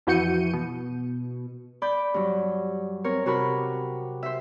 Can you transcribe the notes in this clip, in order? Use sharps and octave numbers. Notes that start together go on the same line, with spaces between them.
F2 E3 F#4 G6 C#7 D#7
B2
D5 B5 G6
G2 F#3
C4 A#4 C#5
C3 F#4 G4 A#4 B5
C5 E5